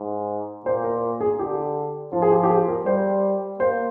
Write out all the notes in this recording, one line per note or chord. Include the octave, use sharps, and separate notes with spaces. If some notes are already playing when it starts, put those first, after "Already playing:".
Already playing: G#2
A#2 C5
A#4
G#4
D3 G4
F3 F4
G#4
G4
G4
G#4
A#4
G3 C5
A#3 C5